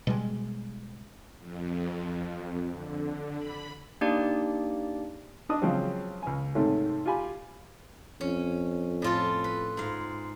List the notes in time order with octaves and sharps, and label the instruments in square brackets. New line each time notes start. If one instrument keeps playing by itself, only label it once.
[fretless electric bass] B2 G3 G#3
[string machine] F2
D3
B5
[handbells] A#3 D4 D#4 G4 D5
[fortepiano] D4 D#5 D#6
C#3 F3 F#3 G#3 C4
C#2 G#5
G#2 C3 D#3 A3 C#4
F4 G4 G#5 B5
[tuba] F2 [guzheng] C#4
[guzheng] A2 F4 A4
B4
G#2 F5